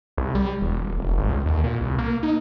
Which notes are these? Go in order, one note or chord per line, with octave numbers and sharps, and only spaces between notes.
C2
G3
E1
D#1
F1
G#1
C#2
D#2
A#2
C2
A#3
D#4